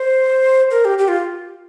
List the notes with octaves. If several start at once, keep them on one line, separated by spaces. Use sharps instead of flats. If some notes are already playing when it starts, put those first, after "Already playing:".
Already playing: C5
A#4
G4
G4
F4